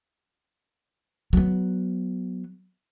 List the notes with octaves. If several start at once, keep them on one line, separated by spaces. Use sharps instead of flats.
F#3 B3